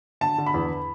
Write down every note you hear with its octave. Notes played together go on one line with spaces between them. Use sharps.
D3 A5
D3
B5
E2